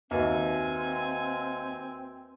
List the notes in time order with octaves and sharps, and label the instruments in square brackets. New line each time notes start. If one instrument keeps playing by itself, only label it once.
[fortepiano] D#2 [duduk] C4 [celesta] F#4 B4 E5 [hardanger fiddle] G#5